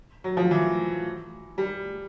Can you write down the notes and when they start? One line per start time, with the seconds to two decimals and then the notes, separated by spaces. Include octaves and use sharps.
0.24 F#3
0.37 F3
0.51 E3
1.58 G3